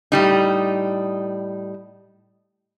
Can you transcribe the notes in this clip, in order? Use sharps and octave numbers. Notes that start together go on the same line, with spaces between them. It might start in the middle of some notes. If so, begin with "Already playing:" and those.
A2 G3 D#4